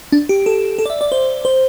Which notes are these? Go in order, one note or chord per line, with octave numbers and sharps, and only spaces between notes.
D4
G4
A4
A4
D5
E5
D5
C5
C5